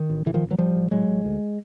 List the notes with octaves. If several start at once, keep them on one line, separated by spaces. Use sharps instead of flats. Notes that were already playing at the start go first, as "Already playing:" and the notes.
Already playing: D#3
A1
A1 D3 E3
D#3 F3
A1
E3 F#3
A1 F3 G3
A1
A2 F#3 G#3
A1
D2